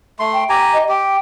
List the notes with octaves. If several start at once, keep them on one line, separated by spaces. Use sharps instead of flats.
A3 C6
G5
G4 G#5 A#5
D#5
G4 G5